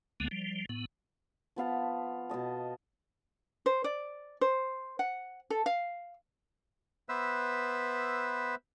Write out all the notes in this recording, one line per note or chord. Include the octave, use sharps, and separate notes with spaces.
D2 D3 G#3 A#3 B3
F3 G3
A2 B3
F3 B3 F5 A5
B2 B3 D#5 A5
C5
D5
C5
F#5
A4
F5
B3 B4 C5 E5 E6